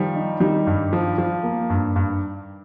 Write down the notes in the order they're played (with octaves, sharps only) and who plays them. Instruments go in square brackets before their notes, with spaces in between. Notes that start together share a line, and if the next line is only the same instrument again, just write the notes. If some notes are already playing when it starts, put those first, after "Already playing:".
Already playing: [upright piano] D#3 G3 [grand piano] F3
[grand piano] D#4
[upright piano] D#3 G3 [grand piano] D#4
[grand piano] G2
F3
F3
A#3
G2
G2